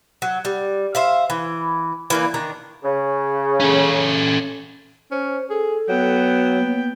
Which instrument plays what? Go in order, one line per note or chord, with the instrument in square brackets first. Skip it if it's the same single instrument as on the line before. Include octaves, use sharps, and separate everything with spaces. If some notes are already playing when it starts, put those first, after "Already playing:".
[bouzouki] F#3
G3
C5 E5 F5
E3
E3 A#3 D5
D#3 D4 A#5
[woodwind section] C#3
[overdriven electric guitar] C#4 A4
[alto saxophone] C#4 [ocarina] C5
[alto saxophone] G#4 [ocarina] A4
[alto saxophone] F#3 [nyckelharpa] B3 G5
[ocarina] A#3